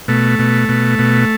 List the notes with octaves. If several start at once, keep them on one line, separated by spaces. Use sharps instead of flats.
B2 A3
B2
B2
B2